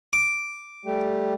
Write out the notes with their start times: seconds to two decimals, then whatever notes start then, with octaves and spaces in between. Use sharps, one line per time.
0.13 D6
0.85 G3 A3 G4